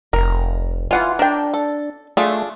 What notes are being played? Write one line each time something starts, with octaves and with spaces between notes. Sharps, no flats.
F1 A#4
E3 F4 F#5 G#5
D4 A#4 G5
A4
A3 D4 F4 G#4